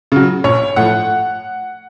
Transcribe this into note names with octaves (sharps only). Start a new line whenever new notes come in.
C#3 F#3
A#1 C#5
A2 F3 F#5